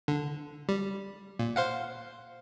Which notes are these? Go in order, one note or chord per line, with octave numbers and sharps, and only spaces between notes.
D3
G3
A#2
C5 F5 F#5